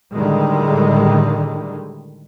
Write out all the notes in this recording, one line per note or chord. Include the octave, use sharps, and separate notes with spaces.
A2 D3 D#3 G3 G#3